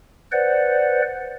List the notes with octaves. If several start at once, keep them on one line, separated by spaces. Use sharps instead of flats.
B4 C5 D5 F#5